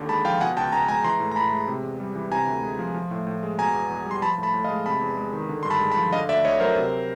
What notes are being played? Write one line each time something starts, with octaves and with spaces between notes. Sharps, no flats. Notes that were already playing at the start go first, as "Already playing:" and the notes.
Already playing: D#2 D3
G#3 A5 B5
F3 F5 G5
B2 F#5 G#5
C#2 G5 A5
C#2 G#5 A#5
G#3 G#5 A#5
E3 A#5 C6
A2
A#5
A2 A5 B5
G#3
C3
E2
G3
E3
C3 G#5 A#5
D2
G#3
F3
F3
A2
A2
G#3
B2 G#5 A#5
E2
E2
G3 C6
F3 A5 B5
A2
A5 B5
A2
D#5 F5
G#3
C3 A5 B5
E2
G#3
D#3
D3
G2 C6
A5 B5
G#3
A5 B5
F3
D3 D#5 F5
D2 D5 E5
D2 C#5 D#5
F#3 A#4 C5
C3